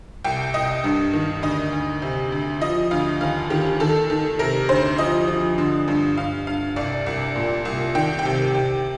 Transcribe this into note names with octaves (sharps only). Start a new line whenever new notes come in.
C2 G5
C2 D#5
G2
D#3
D2 D#5
D2
C3
D2
F3 D#5
D2 F5
D#2 F5
D#3 G4
D#3 A4
D#3
C3 A#4
D2 C5
F3 D#5
F3
D3
G2
G2 F5
G2 F5
C2 D5
C2
A#2
C2
D#3 G5
G5
C3
C3